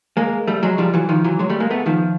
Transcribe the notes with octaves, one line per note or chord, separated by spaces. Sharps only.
G#3 A#3
G3 A3
F#3 G#3
F3 G3
E3 F#3
D#3 F3
E3 F#3
F#3 G#3
G3 A3
G#3 A#3
A3 B3
D#3 F3